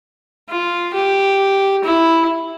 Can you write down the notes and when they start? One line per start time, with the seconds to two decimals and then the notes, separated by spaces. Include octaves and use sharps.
0.49 F4
0.94 G4
1.84 E4